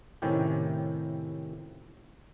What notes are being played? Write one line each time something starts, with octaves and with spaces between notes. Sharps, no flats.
A2 C3 D#3 C#4 E4 G4